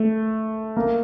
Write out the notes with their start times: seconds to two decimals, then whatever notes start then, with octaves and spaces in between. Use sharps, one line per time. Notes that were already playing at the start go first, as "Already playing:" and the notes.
Already playing: A3
0.76 A#3